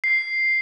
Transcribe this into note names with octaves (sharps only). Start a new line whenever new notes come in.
C7